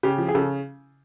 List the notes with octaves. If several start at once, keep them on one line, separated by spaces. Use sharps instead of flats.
C#3 G4
F3
G#4
C#3 A4